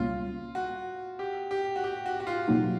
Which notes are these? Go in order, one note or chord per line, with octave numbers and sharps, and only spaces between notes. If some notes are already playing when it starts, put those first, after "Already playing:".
Already playing: C#2 B2 G3 A#3 C#4 F4
F#4
G4
G4
F#4
G4
F#4
F#4
F4
B2 F#3 A#3 D#4